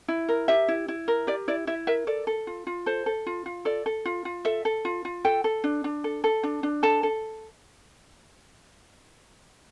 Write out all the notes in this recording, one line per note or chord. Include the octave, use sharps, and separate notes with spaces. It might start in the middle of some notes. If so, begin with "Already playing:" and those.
E4
A#4
G4 E5
E4
E4
A#4
G4 D5
E4 D5
E4 E5
A#4 E5
A4 D5
A4
F4
F4
A4 C5
A4
F4
F4
A4 D5
A4
F4
F4
A4 E5
A4
F4
F4
A4 G5
A4
D4
D4
A4
A4
D4
D4
A4 A5
A4